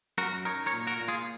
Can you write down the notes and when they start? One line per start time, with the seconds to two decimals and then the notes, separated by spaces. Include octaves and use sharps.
0.18 F#2 F#4 A#4
0.45 D#4 A#4 C#5
0.66 A#4 C#5
0.73 A#2
0.87 F#4 A#4
1.01 A#2
1.08 F4 G#4